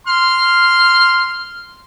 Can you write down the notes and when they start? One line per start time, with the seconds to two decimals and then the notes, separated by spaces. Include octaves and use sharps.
0.07 C6 F6